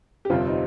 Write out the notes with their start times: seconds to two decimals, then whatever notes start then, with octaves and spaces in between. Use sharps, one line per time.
0.25 G4
0.30 G1 F2 C3 G3 C4 F4
0.47 D#4